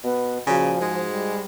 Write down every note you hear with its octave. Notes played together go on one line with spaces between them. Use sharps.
B2 B3
A#2 C#3 F3 F#4 G#5
G#2 G#3
G3